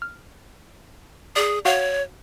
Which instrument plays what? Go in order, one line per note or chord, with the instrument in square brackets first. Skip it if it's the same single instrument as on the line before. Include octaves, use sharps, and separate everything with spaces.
[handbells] F6
[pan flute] G#4 [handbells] D5
[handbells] F#4 F5 F#5 [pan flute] C#5